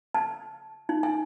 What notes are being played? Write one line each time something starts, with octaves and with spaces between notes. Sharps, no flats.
A5
D#4
G#5